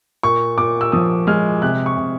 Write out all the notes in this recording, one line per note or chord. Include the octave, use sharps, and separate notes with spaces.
A#2 C#6
A#2 D6
E6
F3 D#6
G#3 F6
C3 F#6
C#6
C3